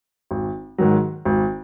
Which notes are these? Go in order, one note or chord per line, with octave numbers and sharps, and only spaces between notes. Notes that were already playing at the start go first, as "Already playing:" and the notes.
G#1
G#2 D#3 F#3
G#1